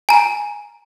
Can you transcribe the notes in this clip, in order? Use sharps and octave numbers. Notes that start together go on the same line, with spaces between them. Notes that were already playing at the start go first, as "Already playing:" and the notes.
G#5 A#5